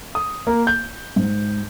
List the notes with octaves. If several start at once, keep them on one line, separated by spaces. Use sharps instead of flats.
D#6
A#3
G6
G#2